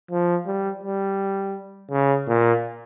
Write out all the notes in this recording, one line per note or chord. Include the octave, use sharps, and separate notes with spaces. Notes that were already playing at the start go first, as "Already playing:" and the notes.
F3
G3
G3
C#3
A#2